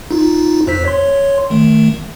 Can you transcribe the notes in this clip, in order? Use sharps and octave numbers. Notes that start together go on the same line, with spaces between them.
D#4 F4
F2 C5 B6
C#5 C6
D#3 A3